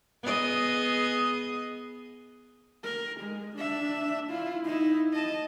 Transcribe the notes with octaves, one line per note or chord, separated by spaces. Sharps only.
B3 G#4 D#5
A#4
G#3
D4 E5
E4 F4
D#4 E4
D#5 A5